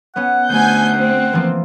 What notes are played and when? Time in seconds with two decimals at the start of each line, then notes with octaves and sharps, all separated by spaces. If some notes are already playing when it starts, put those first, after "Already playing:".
0.16 B3 C#4 F#5
0.49 D2 G#5 G6
0.96 C4
1.33 E3 F3 A#3